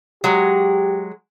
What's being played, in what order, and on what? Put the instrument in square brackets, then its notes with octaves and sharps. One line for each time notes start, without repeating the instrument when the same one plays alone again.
[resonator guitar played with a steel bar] F#3 G#3 [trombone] G4